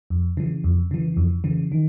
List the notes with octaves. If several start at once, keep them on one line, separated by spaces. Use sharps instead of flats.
F2
C#3 E3
F2
C#3 E3
F2
C#3 E3
D#3